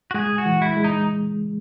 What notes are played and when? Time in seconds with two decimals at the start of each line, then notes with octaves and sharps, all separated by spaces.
0.11 F#4
0.14 G#3 G#4
0.38 F#4
0.46 E3
0.62 E4
0.77 G#3
0.84 D#4